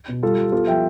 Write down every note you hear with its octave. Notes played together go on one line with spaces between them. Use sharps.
B2
G3 F4 A4
G3
B3 F4 A4
F3 E5 G5